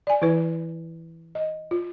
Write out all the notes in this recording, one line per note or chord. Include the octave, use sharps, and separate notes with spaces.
D5 G#5
E3 E4 B4
D#5
F4